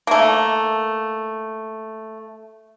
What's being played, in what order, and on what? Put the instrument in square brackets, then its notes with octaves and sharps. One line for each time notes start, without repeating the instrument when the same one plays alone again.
[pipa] A3 A#3